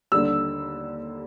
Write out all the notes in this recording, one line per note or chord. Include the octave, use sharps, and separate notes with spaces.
D#2 D3 G3 E6